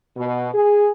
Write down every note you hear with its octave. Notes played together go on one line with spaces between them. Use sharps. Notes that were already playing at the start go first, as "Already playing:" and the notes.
B2
G#4